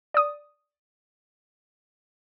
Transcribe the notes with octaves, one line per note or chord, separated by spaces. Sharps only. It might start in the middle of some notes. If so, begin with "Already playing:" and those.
D5 D#6